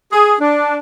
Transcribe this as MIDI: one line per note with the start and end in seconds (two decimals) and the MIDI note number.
0.13 0.35 68
0.41 0.78 62